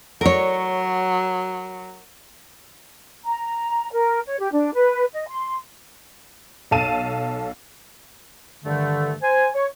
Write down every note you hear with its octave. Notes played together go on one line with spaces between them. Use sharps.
F#3 A#4 C#5
A#5
A#4
C#5
G4
D4
B4
D#5
C6
B1 A4 F5 A5 D#7 E7
G2 D3 D#3 A3
C5 G#5
C#5